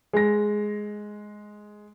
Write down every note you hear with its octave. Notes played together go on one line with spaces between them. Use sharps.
G#3 A#6